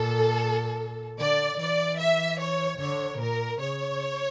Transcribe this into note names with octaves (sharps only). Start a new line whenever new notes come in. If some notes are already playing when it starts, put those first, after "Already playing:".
Already playing: A#2 A4
D3 D5
E3 D5
E5
C#5
D3 C#5
A#2 A#4
C#3 C#5